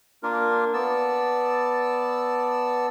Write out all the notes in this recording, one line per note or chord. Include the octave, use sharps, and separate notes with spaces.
A#3 D4 F4 A#4
B3 D5 A5 E6